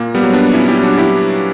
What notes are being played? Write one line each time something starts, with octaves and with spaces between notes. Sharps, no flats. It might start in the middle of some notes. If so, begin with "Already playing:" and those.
Already playing: A#2 A#3
G3 B3
F#3
B3 D4
A#2 C#4 E4
E4 G4
F#3 D4 F#4
E4 G4